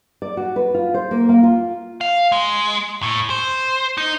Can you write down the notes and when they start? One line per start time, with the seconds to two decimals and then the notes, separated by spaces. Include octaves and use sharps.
0.22 D5
0.37 F#4
0.56 B4
0.74 F4
0.94 C5
1.11 A#3
1.29 A#3
1.43 F4
2.01 F5
2.32 G#3
3.03 A2
3.30 C5
3.98 D#4